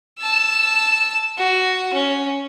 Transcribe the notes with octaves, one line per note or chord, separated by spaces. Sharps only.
A5 E6
F#4
C#4